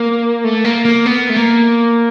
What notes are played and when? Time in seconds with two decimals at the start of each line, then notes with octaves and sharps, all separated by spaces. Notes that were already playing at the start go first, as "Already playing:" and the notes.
Already playing: A#3
0.44 A3
0.64 A#3
0.85 A#3
1.06 B3
1.29 A3
1.36 A#3